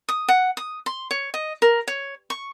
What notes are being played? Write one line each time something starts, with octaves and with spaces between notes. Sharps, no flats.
D#6
F#5
D#6
C6
C#5
D#5
A#4
C#5
C#6